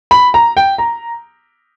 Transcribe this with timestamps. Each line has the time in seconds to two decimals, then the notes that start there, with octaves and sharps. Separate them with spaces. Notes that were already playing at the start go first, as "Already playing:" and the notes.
0.11 B5
0.34 A#5
0.57 G5
0.78 A#5